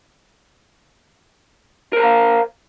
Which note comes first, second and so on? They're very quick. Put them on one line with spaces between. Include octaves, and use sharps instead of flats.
A#4 C5 A#5 F5